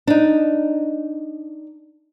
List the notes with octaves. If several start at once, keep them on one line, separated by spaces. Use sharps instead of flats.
D4 D#4